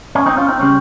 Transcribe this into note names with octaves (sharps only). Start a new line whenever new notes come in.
C#4
C4 D#4
C#4 F4
C4 D#4
C#3 G3 C4 C#4